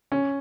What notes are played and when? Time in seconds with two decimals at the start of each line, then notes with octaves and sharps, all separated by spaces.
0.12 C#4